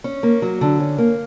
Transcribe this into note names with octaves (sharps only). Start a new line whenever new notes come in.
C#4
A#3
F#3
D3
C#4
A#3